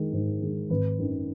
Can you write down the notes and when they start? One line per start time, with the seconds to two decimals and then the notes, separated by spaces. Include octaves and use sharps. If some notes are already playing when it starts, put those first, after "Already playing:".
Already playing: D#3 G#3
0.13 G#2
0.42 D#3 G#3
0.70 G#1 B4
0.99 F#2 D#3